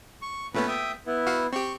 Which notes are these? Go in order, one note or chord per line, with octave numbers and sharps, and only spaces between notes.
C#6
A#2 A3 B3 C#4 B4
E5 G5 D#6
B3 E4
F#4 F5 F#5
C4 G4 C#6